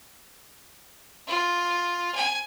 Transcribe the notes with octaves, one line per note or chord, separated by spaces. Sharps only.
F4
G#5